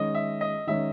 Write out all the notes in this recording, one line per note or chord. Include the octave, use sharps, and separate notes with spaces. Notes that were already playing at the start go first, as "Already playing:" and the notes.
Already playing: D#3 G#3 C#4 D#5
E5
D#5
D#3 G#3 C#4 E5